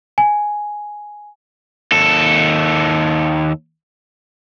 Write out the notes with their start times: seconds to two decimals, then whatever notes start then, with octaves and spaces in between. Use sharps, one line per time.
0.18 G#5
1.92 D#2 A4